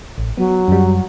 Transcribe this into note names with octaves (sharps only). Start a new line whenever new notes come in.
A1
F#3 B3
F#2 G3